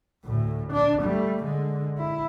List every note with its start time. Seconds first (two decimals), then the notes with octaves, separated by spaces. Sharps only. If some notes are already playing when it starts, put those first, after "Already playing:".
0.24 D2 A2
0.72 D4
1.02 G3 A3
1.43 D3 G#3
1.97 E4